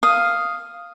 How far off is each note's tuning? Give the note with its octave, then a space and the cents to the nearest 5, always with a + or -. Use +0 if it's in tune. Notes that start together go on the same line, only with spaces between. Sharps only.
F5 +0 D#6 +0